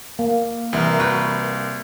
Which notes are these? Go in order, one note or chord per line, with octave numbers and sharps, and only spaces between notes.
A#3
C2 E3 A#4
F#4 B4 G5